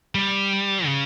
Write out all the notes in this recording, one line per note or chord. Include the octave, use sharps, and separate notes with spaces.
G3
C#3